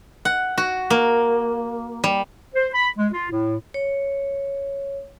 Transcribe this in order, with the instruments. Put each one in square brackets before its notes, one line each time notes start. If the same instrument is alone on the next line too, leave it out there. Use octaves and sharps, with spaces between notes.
[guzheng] F#5
F#4
A#3
G3
[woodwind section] C5
B5
G#3
F4
A2
[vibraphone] C#5